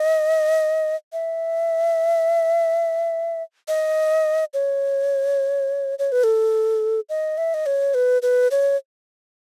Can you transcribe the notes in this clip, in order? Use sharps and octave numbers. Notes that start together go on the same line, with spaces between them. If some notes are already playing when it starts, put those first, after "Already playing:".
Already playing: D#5
E5
D#5
C#5
C#5
B4
A4
D#5
E5
D#5
C#5
B4
B4
C#5